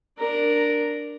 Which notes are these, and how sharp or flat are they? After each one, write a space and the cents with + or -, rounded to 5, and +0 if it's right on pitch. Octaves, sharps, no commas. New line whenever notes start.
D4 +0 A#4 +0